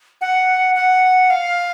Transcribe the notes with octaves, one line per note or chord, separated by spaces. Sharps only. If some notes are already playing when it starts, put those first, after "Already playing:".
F#5
F#5
F5